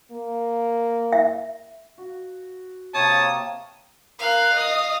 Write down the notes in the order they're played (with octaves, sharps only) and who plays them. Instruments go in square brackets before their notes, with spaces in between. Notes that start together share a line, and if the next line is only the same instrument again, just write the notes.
[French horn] A#3
[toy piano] E5
[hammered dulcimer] F#4
[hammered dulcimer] C3 A#3 [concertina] C#5 [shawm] A5 [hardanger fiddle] D#6
[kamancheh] A#4 F#6 [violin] F5
[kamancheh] D#5 D#6